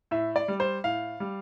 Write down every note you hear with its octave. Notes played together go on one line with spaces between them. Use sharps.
A2 E5
D5
G3
C5
A2 F5
G3